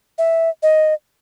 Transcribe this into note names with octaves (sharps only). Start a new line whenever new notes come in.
E5
D#5